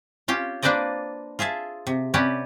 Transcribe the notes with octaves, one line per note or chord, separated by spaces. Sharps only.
C#4 F4 G4
A#3 D4 B4 C5 D5 D#5
F4 G#4 E5 A5
C3
C3 C#4 G4 B4 D5 F#5